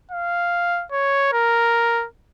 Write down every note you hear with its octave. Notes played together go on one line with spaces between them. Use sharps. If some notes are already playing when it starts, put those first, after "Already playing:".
F5
C#5
A#4